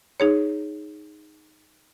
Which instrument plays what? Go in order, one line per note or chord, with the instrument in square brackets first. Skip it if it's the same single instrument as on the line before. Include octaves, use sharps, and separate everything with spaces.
[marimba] D#4 G#4 C#5